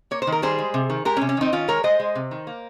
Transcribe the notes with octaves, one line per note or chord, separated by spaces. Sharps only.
A#3 C#5
C5
D#3
A#4
G3 G#4 C5
G#3
C3
D#3
G#3 G4 A#4
C#4
C3
C#4
D#3 C4 D#4
D#3 C#4 F4
G#3 A#4 C#5
G#3 C5 D#5
G#3
C3
D#3
A#3